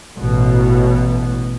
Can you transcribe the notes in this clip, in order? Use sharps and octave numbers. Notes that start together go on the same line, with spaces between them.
A1 B2